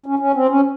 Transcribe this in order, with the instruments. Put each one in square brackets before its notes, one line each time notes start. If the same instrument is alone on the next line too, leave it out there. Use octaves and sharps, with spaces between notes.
[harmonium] C#4
C#4
C4
C#4